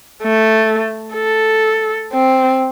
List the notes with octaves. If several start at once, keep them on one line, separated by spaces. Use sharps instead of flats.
A3
A4
C4